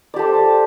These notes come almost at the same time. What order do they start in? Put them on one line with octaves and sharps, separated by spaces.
D5 G4 A4 C5